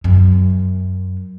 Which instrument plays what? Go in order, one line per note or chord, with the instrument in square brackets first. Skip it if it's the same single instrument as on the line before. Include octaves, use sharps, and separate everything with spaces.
[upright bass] F#2